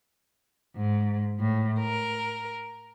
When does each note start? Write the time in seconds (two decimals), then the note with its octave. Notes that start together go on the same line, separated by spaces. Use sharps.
0.75 G#2
1.39 A2
1.80 A#4